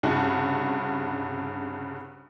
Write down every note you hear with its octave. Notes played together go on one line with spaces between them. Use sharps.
C2 G2 C#3 F#4